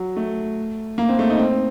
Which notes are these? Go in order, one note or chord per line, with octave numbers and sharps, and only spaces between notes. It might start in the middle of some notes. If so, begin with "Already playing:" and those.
Already playing: F#3
A3
A#3
C4
A3
D#4
C4